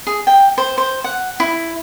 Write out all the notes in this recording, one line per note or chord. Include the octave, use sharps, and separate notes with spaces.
G#4
G5
C5
C5
F#5
E4